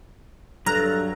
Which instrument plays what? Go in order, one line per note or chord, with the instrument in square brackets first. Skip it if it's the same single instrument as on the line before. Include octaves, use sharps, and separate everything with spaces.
[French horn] G2 [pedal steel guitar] F#3 F6 F#6 [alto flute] A4 [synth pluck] A#5